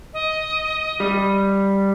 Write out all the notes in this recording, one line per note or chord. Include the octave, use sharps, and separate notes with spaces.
D#5
G3